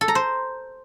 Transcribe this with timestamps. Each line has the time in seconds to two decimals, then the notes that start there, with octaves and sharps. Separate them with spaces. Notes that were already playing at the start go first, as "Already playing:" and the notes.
0.01 A4
0.08 A#5
0.15 C5